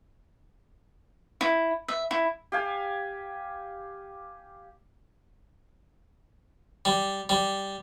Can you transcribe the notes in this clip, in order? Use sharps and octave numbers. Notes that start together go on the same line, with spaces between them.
E4
E5
E4
G4 F5 G#5
G3
G3